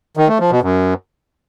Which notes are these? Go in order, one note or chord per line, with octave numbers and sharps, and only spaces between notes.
D#3
A3
F3
B2
F#2